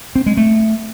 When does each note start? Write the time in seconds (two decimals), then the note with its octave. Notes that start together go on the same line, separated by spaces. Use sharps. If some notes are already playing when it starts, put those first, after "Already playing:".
0.16 C4
0.26 G#3
0.37 A3